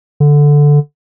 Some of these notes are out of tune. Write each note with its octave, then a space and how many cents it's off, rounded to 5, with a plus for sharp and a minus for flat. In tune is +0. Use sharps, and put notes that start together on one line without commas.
D3 -5